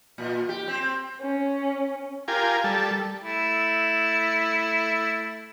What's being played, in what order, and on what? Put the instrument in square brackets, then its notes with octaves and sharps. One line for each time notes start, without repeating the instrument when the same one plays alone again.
[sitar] A#2
G4
C4
[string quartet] C#4
[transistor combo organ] F4 G4 A#4 G#5
G3 A4
[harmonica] A3 E4